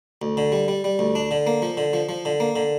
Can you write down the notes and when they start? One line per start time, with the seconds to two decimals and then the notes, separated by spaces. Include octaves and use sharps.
0.22 D2
0.37 D3
0.52 G3
0.68 G3
0.84 G3
0.99 D2
1.15 D4
1.31 D3
1.47 A#3
1.62 F3
1.77 D3
1.93 F3
2.09 F3
2.25 D3
2.40 A#3
2.56 D3